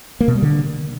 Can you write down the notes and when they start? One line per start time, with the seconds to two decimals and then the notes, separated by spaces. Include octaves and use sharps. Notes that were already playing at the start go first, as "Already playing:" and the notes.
0.20 A#3
0.28 B2
0.35 G3
0.42 D3